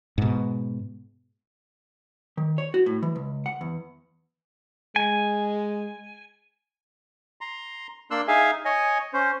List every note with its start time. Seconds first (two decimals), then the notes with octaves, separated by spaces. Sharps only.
0.18 G#2 B2
2.37 D#3
2.58 C#5
2.74 F#4
2.86 A2
3.02 E3
3.16 C#2
3.46 F#5
3.61 E2
4.96 G#3 G#5
7.41 A#5 C6
8.11 A#3 D4 C6 E6 F#6
8.28 D#4 G#4 E5 F5 G#5
8.65 C#5 D#5 G#5
9.13 C#4 C5